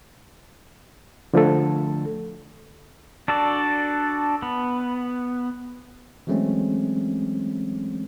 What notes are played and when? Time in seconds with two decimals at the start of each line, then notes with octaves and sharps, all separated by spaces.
1.34 D3 F3 A3 A4
3.28 D4 F#4 A4 D5
4.42 B3
6.27 E3 F#3 G#3 A3 C4 C#4